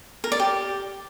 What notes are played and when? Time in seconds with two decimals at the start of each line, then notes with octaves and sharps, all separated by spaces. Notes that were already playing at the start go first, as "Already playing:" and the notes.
0.24 A#4
0.32 D5
0.40 G4